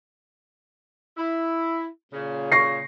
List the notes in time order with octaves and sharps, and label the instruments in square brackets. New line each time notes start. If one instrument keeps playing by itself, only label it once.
[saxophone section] E4
A#2 C#3
[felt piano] C#6 A#6 C7